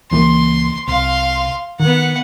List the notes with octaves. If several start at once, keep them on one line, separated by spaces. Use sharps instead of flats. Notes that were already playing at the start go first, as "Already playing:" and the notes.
C#2 E3 A#3 C6
C2 F5 C6
D#3 B3 F#5